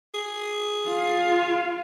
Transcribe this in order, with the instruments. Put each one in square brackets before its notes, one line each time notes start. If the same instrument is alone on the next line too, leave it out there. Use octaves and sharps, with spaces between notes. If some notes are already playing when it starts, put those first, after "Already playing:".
[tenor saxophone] G#4
[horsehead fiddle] F4 F5